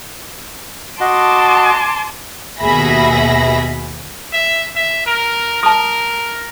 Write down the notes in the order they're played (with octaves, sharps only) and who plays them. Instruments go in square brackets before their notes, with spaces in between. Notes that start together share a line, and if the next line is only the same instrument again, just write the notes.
[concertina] F#4 D#5 F#5 [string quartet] A5 C6 D6
[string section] D#2 B2 G#4 E5 B5 A#6
[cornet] E5
E5
A#4
[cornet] A#4 [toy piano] A5 D#6